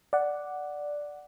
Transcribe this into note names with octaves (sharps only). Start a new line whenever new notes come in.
D5 F#5